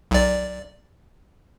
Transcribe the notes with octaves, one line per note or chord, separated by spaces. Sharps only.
B1 D5